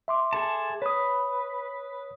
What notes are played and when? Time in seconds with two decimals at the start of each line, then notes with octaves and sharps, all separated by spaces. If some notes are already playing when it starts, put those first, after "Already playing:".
0.08 E5 C6 D6
0.33 G#4 A4 A5
0.82 B4 C#5 D#6